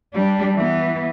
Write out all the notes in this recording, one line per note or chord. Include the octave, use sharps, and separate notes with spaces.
G3 D4
E3 B3